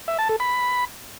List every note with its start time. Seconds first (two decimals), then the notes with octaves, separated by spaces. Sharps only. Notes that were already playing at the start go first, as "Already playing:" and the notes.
0.08 E5
0.19 A5
0.29 A4
0.40 B5